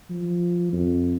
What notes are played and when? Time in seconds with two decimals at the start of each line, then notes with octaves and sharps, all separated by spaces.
0.10 F3
0.73 F2